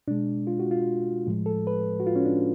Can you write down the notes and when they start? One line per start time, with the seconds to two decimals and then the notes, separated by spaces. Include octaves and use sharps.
0.08 B2 G#3 D4
0.47 F4
0.60 F#4
0.71 F4
1.26 A2 F3 G#3
1.46 A4
1.67 B4
2.00 F#4
2.07 F4
2.16 C#4
2.25 D4